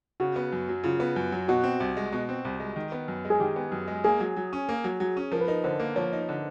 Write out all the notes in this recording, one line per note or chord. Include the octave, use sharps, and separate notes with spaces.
C#3 F#4
B3
F#2
F#3
C#3 F4
B3
F#2
F#3
B2 F#4
C4
C2
G#3
B2
C4
C2
G#3
D#3
B3
F#2
G#3
G#4
D#3 G4
B3
F#2
G#3
A#3 G#4
F#3
F#3
C#4
A#3
F#3
F#3
C#4
F3 A#4
B4
D#4 A#4
D3 C5
A#3
F3 C#5
D#4
D3